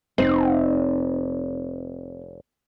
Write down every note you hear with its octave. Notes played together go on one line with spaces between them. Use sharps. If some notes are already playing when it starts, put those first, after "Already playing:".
F1 C4 D#4